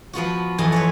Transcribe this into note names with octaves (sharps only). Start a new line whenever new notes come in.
F3 B3 F4 F#4
F2 E3 D#5 G#5 A5
C4 B4 C#5